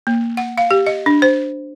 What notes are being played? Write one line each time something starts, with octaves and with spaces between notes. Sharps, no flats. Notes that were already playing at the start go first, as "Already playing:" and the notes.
A#3
F#5
F5
G4
D#5
D4
C5